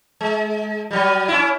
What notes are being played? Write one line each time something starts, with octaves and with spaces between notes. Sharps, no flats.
G#3
F#3 G3
C#4 E4